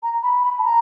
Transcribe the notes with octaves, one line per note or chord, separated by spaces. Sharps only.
A#5
B5
B5
A5
A#5